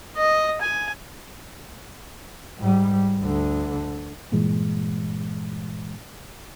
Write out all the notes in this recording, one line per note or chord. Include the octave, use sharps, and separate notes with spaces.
D#5
G#5
G#2 G3
D2 D3
G2 A#2 E3 G#3